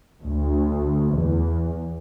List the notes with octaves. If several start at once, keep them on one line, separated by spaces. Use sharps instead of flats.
D2
E2